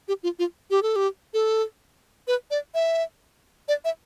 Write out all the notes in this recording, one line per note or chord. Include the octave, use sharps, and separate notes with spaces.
G4
F4
F4
G4
A4
G4
A4
B4
D5
E5
D5
E5